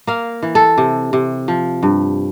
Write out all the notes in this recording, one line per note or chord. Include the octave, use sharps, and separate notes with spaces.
A#3 F5
E3
A4
C3
C3
F3
G2